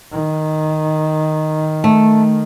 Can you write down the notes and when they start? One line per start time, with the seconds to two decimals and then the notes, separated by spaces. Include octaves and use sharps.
0.12 D#3
1.84 A3